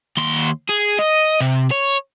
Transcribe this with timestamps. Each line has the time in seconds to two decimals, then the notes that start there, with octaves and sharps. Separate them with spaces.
0.17 D#2 C6
0.69 G#4
0.99 D#5
1.40 C3
1.71 C#5